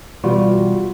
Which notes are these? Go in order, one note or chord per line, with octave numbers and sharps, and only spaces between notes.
B2 E3 G3 F4 F#4